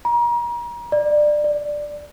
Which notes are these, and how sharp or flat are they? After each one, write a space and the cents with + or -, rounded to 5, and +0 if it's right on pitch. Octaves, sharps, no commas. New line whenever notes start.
A#5 +35
D5 +20
D5 +5